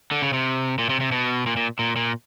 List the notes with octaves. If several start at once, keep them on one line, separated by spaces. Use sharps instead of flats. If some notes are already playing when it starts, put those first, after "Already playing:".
D3
C#3
C3
A#2
C3
C3
B2
A#2
A#2
A#2
A#2